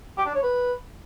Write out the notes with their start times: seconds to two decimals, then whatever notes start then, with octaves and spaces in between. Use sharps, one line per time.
0.18 G4
0.26 D4
0.35 C#5
0.43 B4